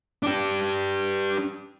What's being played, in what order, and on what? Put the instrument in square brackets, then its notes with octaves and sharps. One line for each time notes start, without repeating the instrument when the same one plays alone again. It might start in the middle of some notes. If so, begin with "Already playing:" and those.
[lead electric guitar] D4 G4